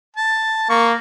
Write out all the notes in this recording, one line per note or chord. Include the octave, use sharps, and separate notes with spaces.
A5
A#3 C#6